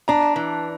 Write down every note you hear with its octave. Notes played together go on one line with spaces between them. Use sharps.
D4 A#5
E3